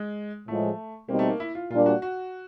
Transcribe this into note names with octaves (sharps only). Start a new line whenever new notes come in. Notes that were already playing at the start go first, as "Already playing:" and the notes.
Already playing: G#3
A2 F3 G#3 A3
B2 G3 A#3 C4 D#4
A3
A#3
E4
F4
A#2 G3 A#3 D4 F4
F#4
F#4